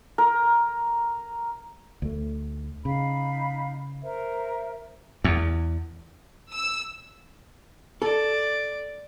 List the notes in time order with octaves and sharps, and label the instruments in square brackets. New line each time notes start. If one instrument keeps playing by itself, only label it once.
[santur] A#4
[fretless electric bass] D2 A3
[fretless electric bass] C#3 [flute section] D#4 F5 B5
[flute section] A#4 C5 E5
[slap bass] E2
[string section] E6
[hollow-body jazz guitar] A4 [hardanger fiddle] D5